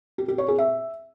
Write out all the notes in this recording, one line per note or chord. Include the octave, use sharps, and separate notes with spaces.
G4
G4
C#5
G#4
E5